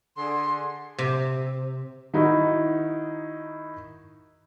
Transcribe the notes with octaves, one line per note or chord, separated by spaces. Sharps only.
D3 G#4 C6
C3
D#3 D#4 E4 F#4